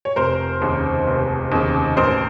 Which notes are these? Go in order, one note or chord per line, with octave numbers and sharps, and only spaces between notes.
C#5
F1 A#4 C5
D#2 C#3
F1
D#2 C#3
A1 A#4 C5